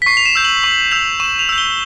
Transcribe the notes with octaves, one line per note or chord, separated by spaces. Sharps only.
B6
C#6 C7
F7
E7
E6 G6
F#7
C#6 F#7
E6 G6 F7
C#6 E7
F7
E6 G6
G7